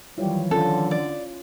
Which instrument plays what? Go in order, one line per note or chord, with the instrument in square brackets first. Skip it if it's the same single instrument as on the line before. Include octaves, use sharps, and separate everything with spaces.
[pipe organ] D#3 E3 F#3 [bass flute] G3 [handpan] E4 F4 C#5
[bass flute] D3 [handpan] C#4 F4 [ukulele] A4
[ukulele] D5